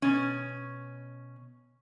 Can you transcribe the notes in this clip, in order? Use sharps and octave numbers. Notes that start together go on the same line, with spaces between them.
B2 C#4